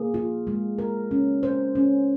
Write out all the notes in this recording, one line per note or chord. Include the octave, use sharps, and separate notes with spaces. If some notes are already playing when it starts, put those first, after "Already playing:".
Already playing: A#3 G#4
F4
G#3
A#4
C#4
C5
C#4